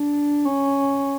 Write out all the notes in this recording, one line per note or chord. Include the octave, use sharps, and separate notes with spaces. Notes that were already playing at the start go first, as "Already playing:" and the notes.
Already playing: D4
C#4